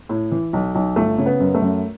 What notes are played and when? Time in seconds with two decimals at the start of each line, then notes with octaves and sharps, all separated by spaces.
0.09 A2
0.32 E3
0.53 B1
0.75 B1
0.96 G1 A3
1.18 C#3
1.26 B3
1.40 F#2
1.54 A3
1.62 F#2